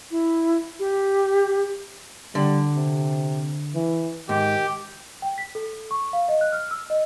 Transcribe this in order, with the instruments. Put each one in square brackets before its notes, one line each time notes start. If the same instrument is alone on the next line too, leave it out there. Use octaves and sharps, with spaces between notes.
[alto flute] E4
G4
[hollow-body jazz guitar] D3 [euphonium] G3
[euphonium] C3
E3
[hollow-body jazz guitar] G#2 [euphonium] D#3 [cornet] G4
[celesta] G5
B6
A4
C#6
F5
D#5
F#6
F6
E6
D#5